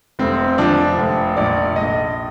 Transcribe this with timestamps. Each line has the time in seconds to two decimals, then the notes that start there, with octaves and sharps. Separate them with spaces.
0.19 F1 C4
0.58 F3 D4
0.98 F1
1.37 A#1 D5
1.76 A#1 D#5